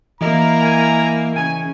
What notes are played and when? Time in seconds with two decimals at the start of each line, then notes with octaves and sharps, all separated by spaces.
0.21 E3 A#3 E4 A#4 D#5 A#5
0.62 G#5
1.36 C#3 G#5